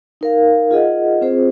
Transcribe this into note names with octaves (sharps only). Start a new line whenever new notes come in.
D#4 A#4 F5
F4 G#4 D#5 F#5
C4 F4 G#4 C5